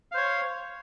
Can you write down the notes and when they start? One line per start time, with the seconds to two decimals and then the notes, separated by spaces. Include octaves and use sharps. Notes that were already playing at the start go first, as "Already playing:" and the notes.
0.12 F5
0.14 C5
0.17 C#5